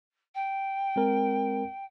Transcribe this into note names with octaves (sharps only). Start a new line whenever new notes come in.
G5
G#3 C4 A#4